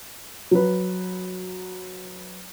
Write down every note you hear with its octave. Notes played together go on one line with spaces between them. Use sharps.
F#3 B4